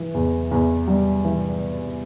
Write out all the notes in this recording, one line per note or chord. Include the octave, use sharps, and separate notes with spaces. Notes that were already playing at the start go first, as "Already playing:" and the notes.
Already playing: E3
E2
E2
G3
E3